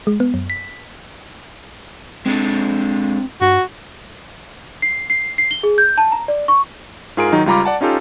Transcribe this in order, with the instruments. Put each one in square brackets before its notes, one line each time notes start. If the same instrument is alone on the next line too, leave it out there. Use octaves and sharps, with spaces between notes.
[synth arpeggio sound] G#3
B3
F#2
B6
[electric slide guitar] G#3 D4 A4 [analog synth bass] C4
[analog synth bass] G2 [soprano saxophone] F#4
[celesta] C7
C7
C7
G7
G#4
G6
A5
A#5
D5
C#6
[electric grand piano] G#2 F4 G#4 A#4 D7
D#3 F#3 D#4
C#2 G3 F4 A#5 B5 D6
D5 F#5 A5
C#4 D#4 F4 G4 A4